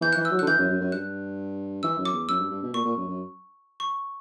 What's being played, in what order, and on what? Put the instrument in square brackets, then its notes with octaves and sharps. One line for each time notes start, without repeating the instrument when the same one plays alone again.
[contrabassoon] E3 [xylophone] G6
[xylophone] F#6
[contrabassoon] E3
[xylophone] E6
[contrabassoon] F#3
[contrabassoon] D3 [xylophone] F#6
[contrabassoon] E3 [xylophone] G6
[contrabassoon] F#2
F#2
F#2
[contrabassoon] G2 [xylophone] F#6
[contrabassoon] E3 [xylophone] E6
[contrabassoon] F#2
[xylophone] D6
[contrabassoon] E2
[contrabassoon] F#2 [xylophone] E6
[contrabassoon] G2
G2
B2
[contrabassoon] A#2 [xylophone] C#6
[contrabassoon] A#2
F#2
F#2
[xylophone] C#6